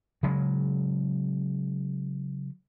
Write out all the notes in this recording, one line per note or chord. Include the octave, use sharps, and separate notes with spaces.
C#3 F#3 G#3